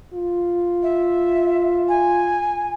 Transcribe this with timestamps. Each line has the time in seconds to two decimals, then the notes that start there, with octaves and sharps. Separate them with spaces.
0.13 F4
0.83 E5
1.88 G#5